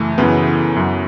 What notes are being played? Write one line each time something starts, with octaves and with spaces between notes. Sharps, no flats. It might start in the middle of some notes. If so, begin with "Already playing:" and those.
Already playing: F#2 C#3 E3 A3
F#2 C#3 E3 B3
F#2 F#3